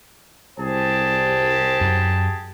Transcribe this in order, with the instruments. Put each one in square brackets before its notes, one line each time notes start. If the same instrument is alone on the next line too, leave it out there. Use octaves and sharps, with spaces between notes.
[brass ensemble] C2 C5 [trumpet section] G4 G#4 A5
[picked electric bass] F#2